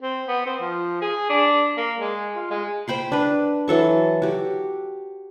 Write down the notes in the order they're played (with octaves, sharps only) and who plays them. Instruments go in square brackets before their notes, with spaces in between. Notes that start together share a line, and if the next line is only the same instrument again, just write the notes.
[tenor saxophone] C4
B3
C4
F3
G#4
D4
A#3
G#3
F4
G#3
[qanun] C5 G5 B5 C6
D4 B4
E3 F#3 A4 C#6
F#4 G4